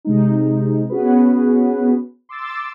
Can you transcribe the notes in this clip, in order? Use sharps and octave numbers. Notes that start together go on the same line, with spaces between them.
C3 G#3 D#4
B3 C#4 F#4 G#4 B4
C6 D6 E6 A6